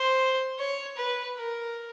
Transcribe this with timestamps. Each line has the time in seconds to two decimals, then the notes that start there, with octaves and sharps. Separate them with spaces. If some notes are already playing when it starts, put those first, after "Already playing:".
Already playing: C5
0.59 C#5
0.97 B4
1.37 A#4